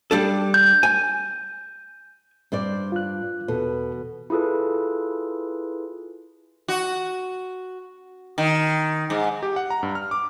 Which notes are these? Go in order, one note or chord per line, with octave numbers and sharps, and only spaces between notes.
G3 D4 A4
G6
G#5
G2 C5 D5
F4 F#6
E2 B2 A4 B4
E4 F4 G#4 A4 B4
F#4
D#3
G#2
G4
F#5
A#5
G2
F6
D6